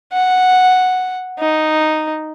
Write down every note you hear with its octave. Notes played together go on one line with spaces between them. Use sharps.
F#5
D#4